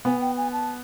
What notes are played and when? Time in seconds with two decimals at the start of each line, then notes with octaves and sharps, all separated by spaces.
0.05 B3 G#5
0.21 G5
0.37 G#5
0.52 A5